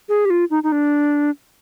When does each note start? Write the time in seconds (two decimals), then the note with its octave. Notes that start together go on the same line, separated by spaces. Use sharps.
0.09 G#4
0.25 G4
0.30 F4
0.50 D#4
0.63 D#4
0.72 D4